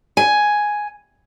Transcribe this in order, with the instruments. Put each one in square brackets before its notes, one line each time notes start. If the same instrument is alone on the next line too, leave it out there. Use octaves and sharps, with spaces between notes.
[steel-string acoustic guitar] G#5